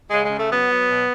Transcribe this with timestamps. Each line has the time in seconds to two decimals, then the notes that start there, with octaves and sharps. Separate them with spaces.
0.10 C#3 G#3
0.24 G#3
0.30 C#3
0.37 A3
0.49 F#3 B3
0.69 F#3
0.89 B2